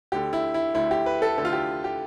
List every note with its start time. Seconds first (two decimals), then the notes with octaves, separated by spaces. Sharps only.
0.12 D2 D3 G4
0.33 E4
0.54 E4
0.74 D2 D3 E4
0.91 G4
1.06 B4
1.22 A4
1.38 D2 D3 A4
1.45 F4
1.53 G4
1.84 G4